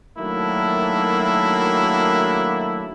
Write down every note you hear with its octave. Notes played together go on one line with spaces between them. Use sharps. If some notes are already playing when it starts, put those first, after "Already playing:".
D#3 F#3 A3 A#3 D4 E4